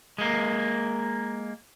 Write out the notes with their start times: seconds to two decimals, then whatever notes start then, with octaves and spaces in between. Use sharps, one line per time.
0.18 G#3 A#3